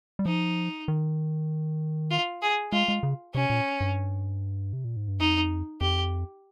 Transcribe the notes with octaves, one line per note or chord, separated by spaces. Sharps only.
G3
F3 D#4
D#3
F4
G#4
G#3 F4
G#3
C#3
C3 C#4
A#2
G2
C3
A#2
G#2
G2
F2 D#4
F2 G4